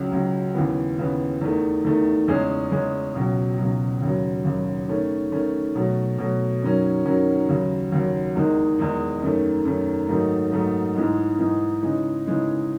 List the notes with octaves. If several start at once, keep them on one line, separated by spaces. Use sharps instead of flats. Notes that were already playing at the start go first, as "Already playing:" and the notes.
Already playing: C#2 C#3 F#3
C#2 C#3 F#3
D#2 C#3 E3 B3
D#2 C#3 E3 B3
E2 D#3 A3
E2 D#3 A3
E2 C#3 G#3 C#4 G#4
E2 C#3 G#3 C#4 G#4
C#2 B2 F#3
C#2 B2 F#3
D#2 C#3 F#3
D#2 C#3 F#3
D#3 A3 C#4
D#3 A3 C#4
B2 F#3 A3
B2 F#3 A3
F#2 D#3 F#3 C#4
F#2 D#3 F#3 C#4
D#2 C#3 F#3
D#2 C#3 F#3
E2 D#3 G#3 D#4
E2 D#3 G#3 D#4
F#2 D#3 A3
F#2 D#3 A3
G#2 D#3 F#3 A3 D#4
G#2 D#3 F#3 A3 D#4
G#2 E3 G#3 D#4
G#2 E3 G#3 D#4
C#3 E3 G#3 D#4
C#3 E3 G#3 D#4